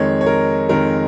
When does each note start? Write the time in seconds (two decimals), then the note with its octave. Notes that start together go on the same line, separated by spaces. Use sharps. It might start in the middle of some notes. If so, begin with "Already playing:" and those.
Already playing: F2 D#3 G#3 C#5
0.21 C#5
0.26 A#4
0.69 F2 D#3 G#3 A#4